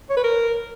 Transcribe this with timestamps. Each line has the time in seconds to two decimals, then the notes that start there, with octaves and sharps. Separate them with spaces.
0.10 C#5
0.17 B4
0.24 A#4